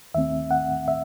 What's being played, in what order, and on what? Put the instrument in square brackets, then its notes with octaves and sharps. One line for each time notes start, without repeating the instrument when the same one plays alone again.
[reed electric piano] D#2 D#3 A3 C4 E5
F#5
E5